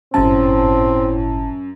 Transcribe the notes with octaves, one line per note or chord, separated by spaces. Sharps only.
G1 F#2 A2 C4 A5